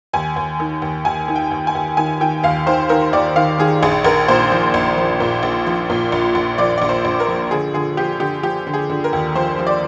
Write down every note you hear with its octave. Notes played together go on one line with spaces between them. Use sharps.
D#2 G#5
D#2
D#3
D#2
D#2 G#5
D#3
G5
D#2
G#5
D#2
D#3 G#5
D#3 G5
D#2 F5
D#3 C5
D#3 A#4
D#2 D5
D#3 F5
D#3 G#4
A#1 G#4
A#1 A#4
A#2 C5
F3
A#1
F3
A#2
A#1
F3
A#2
A#1
A#1
F3 D5
A#1 D5
C5
A#1
A#4
F3
D3 G#4
D3 G#4
F3 G4
D3 G4
F3 G4
D3
G#4
D3
A#4
D#2
F3 C5
F3
D5